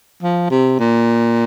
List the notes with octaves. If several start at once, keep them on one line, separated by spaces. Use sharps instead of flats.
F3
C3
A#2